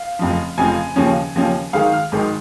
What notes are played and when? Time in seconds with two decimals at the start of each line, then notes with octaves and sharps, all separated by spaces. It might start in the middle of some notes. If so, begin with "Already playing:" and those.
Already playing: F5
0.19 F1 F2 C#3 F3
0.58 F1 F2 C#3 F3 G#5
0.96 D#2 C#3 F3 C#4
1.35 D#2 C#3 F3 C#4
1.73 G#1 G#2 D#3 G#3 F5
1.93 F6
2.12 G#1 G#2 D#3 G#3